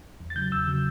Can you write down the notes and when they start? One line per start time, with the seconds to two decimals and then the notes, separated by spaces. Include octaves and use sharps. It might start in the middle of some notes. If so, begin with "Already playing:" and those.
0.20 E2
0.30 A6
0.36 C#3 F#3 G6
0.51 E2 E6
0.68 C#3 F#3